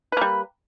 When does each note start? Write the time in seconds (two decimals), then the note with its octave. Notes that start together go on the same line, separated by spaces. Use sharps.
0.12 B4
0.17 A#3
0.21 G3